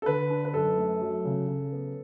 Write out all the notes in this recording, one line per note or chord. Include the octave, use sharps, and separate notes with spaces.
A4
D3 B4
D4
B4
F#2 A4
A3
F#3
C#3
C#3
B3